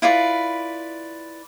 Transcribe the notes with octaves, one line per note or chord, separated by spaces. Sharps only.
E4 F4 B4 D5